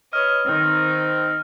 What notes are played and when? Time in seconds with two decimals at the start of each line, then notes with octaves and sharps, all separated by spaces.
0.13 B4 C#5 D#5 F6
0.46 D#3 C4 D#4